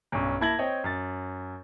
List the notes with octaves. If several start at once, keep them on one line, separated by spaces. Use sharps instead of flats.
B1 G2 C#4
A#3 E4 A5 G#6 A#6 F#7
C4 C#5 D#5 G5
F#2 A6